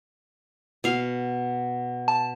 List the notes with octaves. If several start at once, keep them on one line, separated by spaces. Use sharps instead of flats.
B2 F5
A5